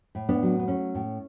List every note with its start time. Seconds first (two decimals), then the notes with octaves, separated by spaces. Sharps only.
0.15 A2
0.29 B3 D4
0.42 F#3
0.59 B3
0.68 A3 C#4
0.95 A2